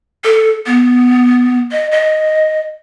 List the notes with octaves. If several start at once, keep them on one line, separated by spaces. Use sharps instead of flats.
A4
B3
D#5
D#5